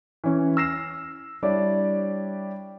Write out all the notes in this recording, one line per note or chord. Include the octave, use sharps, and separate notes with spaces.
E3 C#4
E6 F6 A#6 C7 E7
G3 D4 E4 G4 C#5 D5